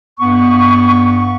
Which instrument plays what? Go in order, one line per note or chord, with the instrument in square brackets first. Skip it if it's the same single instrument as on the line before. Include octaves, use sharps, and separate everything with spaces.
[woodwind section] G2 B3 C#6